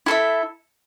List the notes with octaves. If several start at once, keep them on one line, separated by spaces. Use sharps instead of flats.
E4 A4 E5